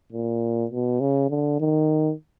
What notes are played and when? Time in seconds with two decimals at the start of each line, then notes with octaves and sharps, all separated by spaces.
0.13 A#2
0.71 B2
1.00 C#3
1.29 D3
1.60 D#3